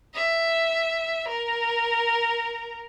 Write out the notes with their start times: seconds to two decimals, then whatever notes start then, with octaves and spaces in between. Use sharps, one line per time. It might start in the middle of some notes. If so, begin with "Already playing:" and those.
0.14 E5
1.28 A#4